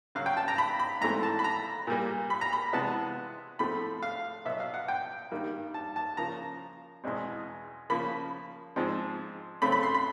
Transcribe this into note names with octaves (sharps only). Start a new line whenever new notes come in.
F#2 C#3 F#3 F5
G5
A5
A#5
B5
B5
G#2 E3 A3 C4 A#5
A5
B5
A#5
A#2 G3 A#3
B5
A#5
B5
C3 E3 G#3 B3 A5
A2 F3 A3 C4 B5
F5
B2 F#3 B3 E5
F5
F#5
G5
G2 D#3 G3 A#3
A5
A5
C#3 F3 A#3 A#5
E2 B2 G#3 C4
C#3 F3 A#3 B5
G#2 F3 G#3 C4
C#3 F#3 A3 C4 B5
B5
C6
B5